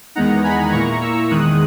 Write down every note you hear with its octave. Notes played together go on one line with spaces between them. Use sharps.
E2 D#3 G#3 B3 D#4 F#5 A#5
G#5 B5
A#2 A#3 E4 A#5 C#6
C#6 E6
E2 D#3 G#3 D#6 F#6